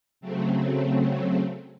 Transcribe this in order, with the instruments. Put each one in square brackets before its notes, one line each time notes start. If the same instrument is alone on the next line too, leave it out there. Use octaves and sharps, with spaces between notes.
[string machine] C#3 F#3 A3 C4